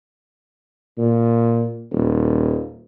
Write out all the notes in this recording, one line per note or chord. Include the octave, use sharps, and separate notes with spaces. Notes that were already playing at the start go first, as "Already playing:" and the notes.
A#2
D#1